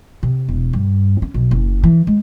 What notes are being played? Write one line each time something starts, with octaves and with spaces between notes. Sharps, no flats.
C3
E1
G2
C#4
B1
F#1
E3
G#3